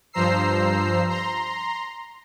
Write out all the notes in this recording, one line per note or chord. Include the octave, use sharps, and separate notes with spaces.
G2 F3 C5 A#5 E6 C7
A#5 C6